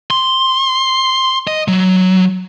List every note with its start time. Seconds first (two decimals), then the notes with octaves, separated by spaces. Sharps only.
0.11 C6
1.47 D#5
1.68 F#3